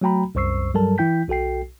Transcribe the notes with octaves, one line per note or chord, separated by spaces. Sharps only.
F#3 A3 F#4 G5 A#5 B5
C2 F#2 C5 C#6 E6 C7
G2 F#3 G3 A4 A#4 A5
E3 E4 G5 G6 B6
B1 F#4 A4 G5 C7